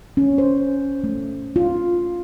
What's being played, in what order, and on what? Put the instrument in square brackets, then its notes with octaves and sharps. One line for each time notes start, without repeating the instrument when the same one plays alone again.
[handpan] C#4
C5
A3
F4